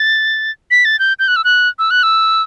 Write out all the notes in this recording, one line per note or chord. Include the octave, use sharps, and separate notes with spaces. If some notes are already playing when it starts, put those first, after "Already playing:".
Already playing: A6
B6
A6
G6
G6
F#6
E6
F#6
E6
F#6
E6